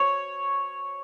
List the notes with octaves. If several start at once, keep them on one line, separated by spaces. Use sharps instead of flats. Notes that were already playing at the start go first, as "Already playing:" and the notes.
Already playing: C#5